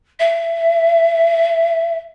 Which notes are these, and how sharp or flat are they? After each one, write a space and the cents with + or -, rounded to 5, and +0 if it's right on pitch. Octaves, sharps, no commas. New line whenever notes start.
E5 +20